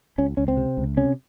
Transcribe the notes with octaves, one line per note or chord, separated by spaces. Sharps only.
C#2 C#4
C#2 C#4
C4
C3
C#2
C3 C#4